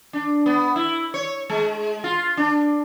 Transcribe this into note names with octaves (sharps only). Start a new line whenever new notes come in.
D4
B3
E4
C#5
G#3
F4
D4